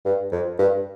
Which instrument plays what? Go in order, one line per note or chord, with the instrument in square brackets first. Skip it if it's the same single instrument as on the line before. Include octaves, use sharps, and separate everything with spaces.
[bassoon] G2
F2
G2